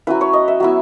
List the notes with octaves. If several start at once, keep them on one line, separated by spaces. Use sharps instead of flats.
F#3 C#4 E4 B4
C#5
D#5
E5
F#3 B3 E4